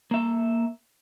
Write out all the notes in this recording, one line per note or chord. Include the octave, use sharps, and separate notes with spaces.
A#3 E5